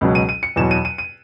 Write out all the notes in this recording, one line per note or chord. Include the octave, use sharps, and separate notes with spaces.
C#2 B2 F#3
D#7
D#7
C#7
E2 B2 F#3 E7
D#7
D#7
D#7